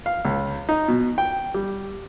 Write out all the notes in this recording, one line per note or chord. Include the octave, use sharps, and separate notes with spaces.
F5
C#2
D#4
B2
G5
G3